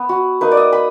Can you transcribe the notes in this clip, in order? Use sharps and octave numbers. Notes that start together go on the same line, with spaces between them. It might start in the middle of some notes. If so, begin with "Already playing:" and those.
Already playing: B3
F#4
A#3 D#4 B4
D5
D#5
B5